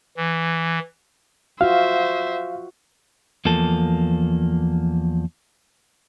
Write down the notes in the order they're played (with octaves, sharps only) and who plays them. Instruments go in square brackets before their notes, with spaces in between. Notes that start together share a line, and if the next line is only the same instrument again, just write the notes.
[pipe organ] E3
[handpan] F4 F#4 [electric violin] C5 E5 [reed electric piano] F5
[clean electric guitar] E2 F3 A#3 A4